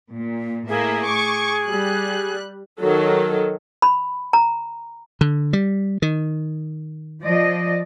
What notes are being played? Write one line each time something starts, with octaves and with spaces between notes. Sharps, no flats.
A#2
A2 A#3 G#4 E5
C#6 D6
G3 F#6
D#3 F#3 A4
B5
A#5
D3
G3
D#3
F3 D5 D#5